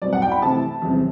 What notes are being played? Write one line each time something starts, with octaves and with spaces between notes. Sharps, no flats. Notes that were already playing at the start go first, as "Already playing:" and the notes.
B2 G3 C4 D5
F#5
G5
B5
C3 E3 A3 A5
E2 C3 G3 C4